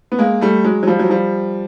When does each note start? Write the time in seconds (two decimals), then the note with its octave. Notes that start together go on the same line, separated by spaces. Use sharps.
0.12 B3
0.19 G#3 A#3
0.41 G3 A3
0.64 F#3 G#3
0.83 F#3
0.87 F3 G3
0.99 F#3
1.10 F3 G3